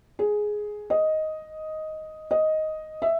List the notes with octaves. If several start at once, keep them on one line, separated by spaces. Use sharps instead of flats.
G#4
D#5
D#5
E5